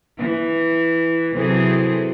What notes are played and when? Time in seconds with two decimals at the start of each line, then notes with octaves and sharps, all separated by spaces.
0.18 E3
1.35 C3 E3 F#3 C4 G#4 A4